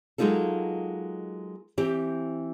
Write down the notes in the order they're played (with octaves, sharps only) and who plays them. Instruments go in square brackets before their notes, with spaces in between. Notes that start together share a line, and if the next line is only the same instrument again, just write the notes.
[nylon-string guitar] F#3 G#3 A#3 D#4 F4 A4
E3 C4 G4